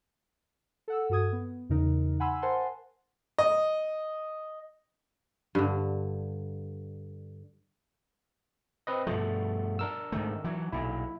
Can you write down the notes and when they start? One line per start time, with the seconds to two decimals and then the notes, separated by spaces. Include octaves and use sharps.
0.88 A4 F#5 E6
1.09 G2 F#4 A4 D#6 G#6
1.32 B3
1.69 E2 C#3 D#4 A#4
2.20 F#5 G#5 B5 C6 E6
2.42 A#4 C5 F#5 G#5 A5 C6
3.39 D#5
5.55 G2 D3
8.87 C4 B4 D#5
9.07 G2 B2 F3 A3
9.79 D4 A#4 E6
10.12 G#2 D#3 A3
10.44 E3 F#3
10.72 B1 A#2 E4